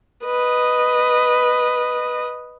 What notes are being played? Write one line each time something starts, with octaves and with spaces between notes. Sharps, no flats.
B4 D#5